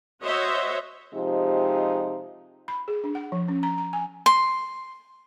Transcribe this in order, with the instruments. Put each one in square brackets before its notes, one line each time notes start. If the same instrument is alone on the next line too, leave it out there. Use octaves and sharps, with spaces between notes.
[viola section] F#4 C5 C#5 D#5 E5
[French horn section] C3 F3 G#3 D#4 G4
[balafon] B5
G#4
D4
F#5
F3
C#4
A#5
A#5
G#5
[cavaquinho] C6